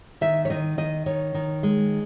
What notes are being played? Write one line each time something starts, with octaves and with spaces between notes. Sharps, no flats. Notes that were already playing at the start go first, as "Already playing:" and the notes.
D#3 E5
C#5
D#3 D#5
D#3 D#5
D#3 C#5
D#3
G#3